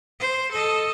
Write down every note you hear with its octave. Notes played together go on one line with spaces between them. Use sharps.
C5
A4 D#5